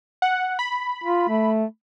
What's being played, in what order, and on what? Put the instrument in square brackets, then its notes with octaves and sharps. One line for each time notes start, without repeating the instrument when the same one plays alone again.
[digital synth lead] F#5
B5
[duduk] F4
A3